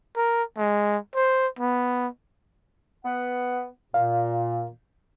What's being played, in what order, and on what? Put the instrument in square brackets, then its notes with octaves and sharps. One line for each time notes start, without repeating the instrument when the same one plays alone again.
[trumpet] A#4
G#3
C5
B3
[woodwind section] B3 F#5
[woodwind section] A#2 [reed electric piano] F5